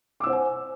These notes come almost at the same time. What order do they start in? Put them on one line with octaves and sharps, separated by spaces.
D6 E6 C5 F#5 G#5